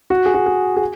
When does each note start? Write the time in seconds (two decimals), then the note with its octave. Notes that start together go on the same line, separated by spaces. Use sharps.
0.10 F#4
0.26 G#4
0.34 F#4
0.46 G#4
0.77 G#4